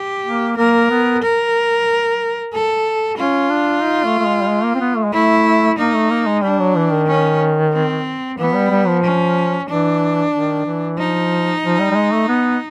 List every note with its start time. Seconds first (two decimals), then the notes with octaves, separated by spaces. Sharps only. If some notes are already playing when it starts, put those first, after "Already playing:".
Already playing: G4
0.25 A#3
0.57 A#3 A#4
0.90 B3
1.22 A#4
2.53 A4
3.18 C#4 F4
3.50 D4
3.82 D#4
4.04 A3
4.19 A3
4.26 G#3
4.41 G3
4.48 G#3
4.64 A#3
4.75 C4
4.80 B3
4.96 A3
5.05 G#3
5.13 A3 E4
5.78 A#3 D#4
5.94 A3
6.10 A#3
6.26 G#3
6.43 G3 D4
6.59 F#3
6.76 E3
6.91 D#3
7.08 C#4
7.73 C4
8.38 E3 B3
8.54 G3
8.70 G3
8.87 F3
9.03 C#4
9.68 E3 D4
10.33 D#3
10.65 E3
10.98 F3 D#4
11.63 F3
11.80 G3
11.91 G3
11.96 G#3
12.13 A3
12.28 B3